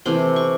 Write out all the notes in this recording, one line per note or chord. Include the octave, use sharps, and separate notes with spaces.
C3 E3 A3 C6
C#6